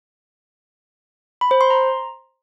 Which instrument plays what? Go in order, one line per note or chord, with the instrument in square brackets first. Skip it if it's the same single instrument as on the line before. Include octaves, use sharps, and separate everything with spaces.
[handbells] B5
C5
C6
A#5